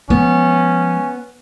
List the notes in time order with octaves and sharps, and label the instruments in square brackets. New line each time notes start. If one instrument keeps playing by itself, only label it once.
[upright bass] F3 G#3 [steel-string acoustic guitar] B3 [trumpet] C#4